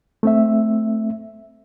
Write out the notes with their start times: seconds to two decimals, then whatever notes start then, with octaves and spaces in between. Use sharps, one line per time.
0.23 A3 C4 E5